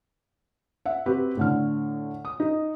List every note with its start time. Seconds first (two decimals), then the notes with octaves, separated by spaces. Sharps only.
0.86 E5 F#5
1.06 C4 F#4 G4 B4
1.37 A2 D3 F6
2.25 D#6
2.40 D#4